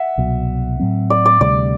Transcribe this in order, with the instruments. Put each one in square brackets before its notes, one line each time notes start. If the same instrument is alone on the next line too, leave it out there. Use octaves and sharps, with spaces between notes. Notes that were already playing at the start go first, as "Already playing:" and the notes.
Already playing: [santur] E5 F#5
[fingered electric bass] C2 B2 F#3
A2 F#3 C4
[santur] D5
D5
[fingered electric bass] D2 C3 G3 [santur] D5